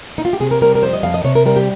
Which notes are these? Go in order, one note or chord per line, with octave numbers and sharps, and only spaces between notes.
D#4
F4
G4
C3 G#4
A#4
G3 A#4
A#4
F2 C5
D#5
F2 F5
D#5
C3 C#5
A#4
G3 A#4
G4